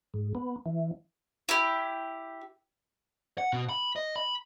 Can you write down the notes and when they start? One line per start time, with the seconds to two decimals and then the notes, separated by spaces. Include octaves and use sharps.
0.14 G#2
0.35 B3
0.66 E3
1.49 E4 G4
3.38 F#5
3.53 B2
3.69 B5
3.96 D#5
4.16 B5